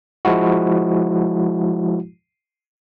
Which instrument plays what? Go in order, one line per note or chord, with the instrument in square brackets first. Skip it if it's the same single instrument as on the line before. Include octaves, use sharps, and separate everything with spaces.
[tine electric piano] F3 G#3 E4 F#4